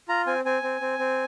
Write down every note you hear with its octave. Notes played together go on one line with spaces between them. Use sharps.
F4 A#5
C4 G#5
C4 G#5
C4
C4
C4